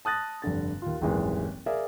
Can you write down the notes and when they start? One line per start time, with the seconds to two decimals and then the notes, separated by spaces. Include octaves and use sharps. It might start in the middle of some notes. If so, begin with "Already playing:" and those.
0.05 A5 D#6 F#6 A6 A#6
0.42 F1 G2 D3 A6
0.82 D#2 F4
1.01 D#1 G#1 F#2 E3 G#3
1.66 G#4 A#4 D5 E5 F5 G#5